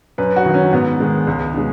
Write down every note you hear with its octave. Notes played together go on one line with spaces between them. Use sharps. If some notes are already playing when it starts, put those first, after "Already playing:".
F#2 B4
F#4
D#3 F#3
C#4
G#2 B3
D#3 G#3
C#2
B2 G#3